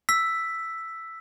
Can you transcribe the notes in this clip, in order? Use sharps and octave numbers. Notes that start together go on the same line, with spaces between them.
E6 B6